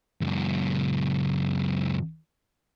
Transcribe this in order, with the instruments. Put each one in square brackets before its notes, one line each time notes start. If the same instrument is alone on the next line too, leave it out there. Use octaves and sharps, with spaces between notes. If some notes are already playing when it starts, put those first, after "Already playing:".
[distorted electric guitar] C#2 F#2